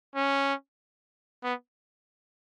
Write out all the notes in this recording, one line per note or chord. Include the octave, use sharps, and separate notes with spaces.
C#4
B3